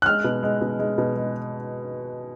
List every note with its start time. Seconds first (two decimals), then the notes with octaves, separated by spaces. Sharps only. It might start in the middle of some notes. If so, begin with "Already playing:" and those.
0.02 F#6
0.06 G#3 F6
0.24 B2
0.43 G#3
0.61 B2
0.79 G#3
0.98 B2
1.16 G#3